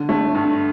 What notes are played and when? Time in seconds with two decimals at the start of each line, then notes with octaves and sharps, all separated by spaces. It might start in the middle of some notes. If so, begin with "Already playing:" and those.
Already playing: D3
0.09 A3
0.35 G2